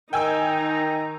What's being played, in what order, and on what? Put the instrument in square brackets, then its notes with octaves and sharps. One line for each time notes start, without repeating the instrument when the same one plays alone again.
[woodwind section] D#3 [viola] D#4 [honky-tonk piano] G5 G#5 E6 [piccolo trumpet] A#5